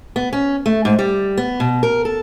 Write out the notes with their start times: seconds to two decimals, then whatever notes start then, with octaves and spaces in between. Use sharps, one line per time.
0.16 B3
0.33 C#4
0.66 A3
0.85 G#2
0.99 G3
1.37 B3
1.60 B2
1.83 A#4
2.05 A4